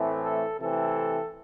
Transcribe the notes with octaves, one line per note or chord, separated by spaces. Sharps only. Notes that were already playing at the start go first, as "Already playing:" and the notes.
Already playing: A2 E3 A3 C4
A4
C3 E3 A3 C4 A4